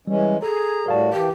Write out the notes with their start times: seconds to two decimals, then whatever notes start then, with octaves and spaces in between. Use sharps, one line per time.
0.07 E3 G3 G#3 C#4
0.43 G#4 A4 A#5
0.86 A2 G3 F#4 A#4 F5 A5
1.13 E3 G4